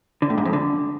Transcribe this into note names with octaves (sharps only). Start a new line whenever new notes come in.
D3
A2
G#2
F2
D3